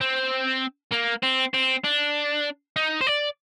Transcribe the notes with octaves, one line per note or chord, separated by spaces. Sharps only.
C4
A#3
C4
C4
D4
D#4
C5
D5